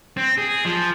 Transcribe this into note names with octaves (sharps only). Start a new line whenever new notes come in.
C4
G#4
F3